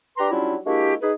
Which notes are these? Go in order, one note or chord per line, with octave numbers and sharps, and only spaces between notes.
D4 G4 B4 A#5 C6
F#3 G3 C#4 D4 E4 F4
G#3 A#3 D4 E4 F#4 G4
D#4 G#4 B4